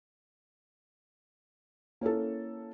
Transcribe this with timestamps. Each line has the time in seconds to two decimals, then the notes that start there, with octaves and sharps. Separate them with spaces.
2.01 A#3 C#4 E4 A4